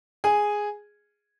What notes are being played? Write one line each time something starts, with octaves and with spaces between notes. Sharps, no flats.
G#4 G#5